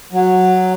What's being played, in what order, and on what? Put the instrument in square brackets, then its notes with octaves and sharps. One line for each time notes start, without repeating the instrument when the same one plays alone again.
[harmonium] F#3